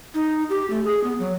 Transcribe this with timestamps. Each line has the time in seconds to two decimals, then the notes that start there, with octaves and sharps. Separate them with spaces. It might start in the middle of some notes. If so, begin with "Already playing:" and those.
0.14 D#4
0.50 G4
0.70 A3
0.85 G#4
1.04 B3
1.19 F#3